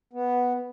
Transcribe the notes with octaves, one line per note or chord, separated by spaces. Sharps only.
B3